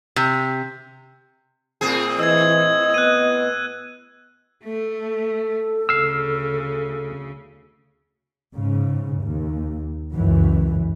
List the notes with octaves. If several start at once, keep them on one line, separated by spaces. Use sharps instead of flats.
C3
A2 C4 G#4
E3 D#5 E6 G#6
B3 F#6 D#7
A3 A4
D2 C#3 E6 F6 C7
G#2 C#3
D#2
C#2 F#2 E3